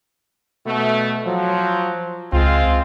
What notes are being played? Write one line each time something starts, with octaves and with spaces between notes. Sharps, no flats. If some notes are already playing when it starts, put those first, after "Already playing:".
B2 A3
F3 F#3
C#2 G#3 C4 F4